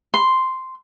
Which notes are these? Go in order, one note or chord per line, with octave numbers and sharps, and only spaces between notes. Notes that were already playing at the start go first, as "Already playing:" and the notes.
C6